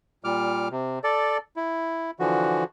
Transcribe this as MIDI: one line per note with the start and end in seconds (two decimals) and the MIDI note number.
0.24 0.68 46
0.24 0.68 55
0.24 0.68 86
0.24 0.68 89
0.71 0.99 48
1.04 1.38 69
1.04 1.38 74
1.56 2.11 64
2.19 2.64 50
2.19 2.64 52
2.19 2.64 53
2.19 2.64 66